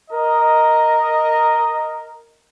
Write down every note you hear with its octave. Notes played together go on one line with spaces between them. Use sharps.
A#4 D#5